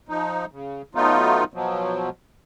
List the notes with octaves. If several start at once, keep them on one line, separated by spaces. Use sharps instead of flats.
F3 D#4
C#3
F#3 A3 B3 D#4 F4
B2 F3 F#3